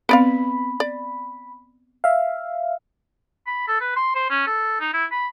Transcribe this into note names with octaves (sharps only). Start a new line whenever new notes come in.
B3 C4 B4 D5 F5 B5
D5
E5 F5
B5
A4
B4
C6
C5
C#4
A4
D#4
E4
B5